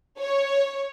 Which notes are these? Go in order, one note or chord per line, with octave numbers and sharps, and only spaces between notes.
C#5